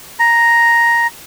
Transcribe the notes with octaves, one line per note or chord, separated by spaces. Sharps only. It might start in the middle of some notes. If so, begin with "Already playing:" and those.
A#5